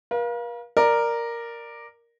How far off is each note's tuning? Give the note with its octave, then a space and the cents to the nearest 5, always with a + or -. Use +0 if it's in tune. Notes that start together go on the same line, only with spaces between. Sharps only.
A#4 +45 F5 +0
A#4 +0 D5 +15